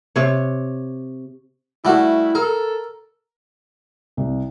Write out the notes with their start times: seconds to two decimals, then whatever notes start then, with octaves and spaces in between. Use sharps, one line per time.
0.16 C3 C#5
1.85 G3 A3 E4 F#4
2.35 A4 A#4
4.17 C2